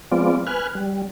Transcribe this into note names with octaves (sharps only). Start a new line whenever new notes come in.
F3 G#3 B3 C4 F4 D5
B4 G#5 F6 F#6
G3